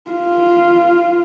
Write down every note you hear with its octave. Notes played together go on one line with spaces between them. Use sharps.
F4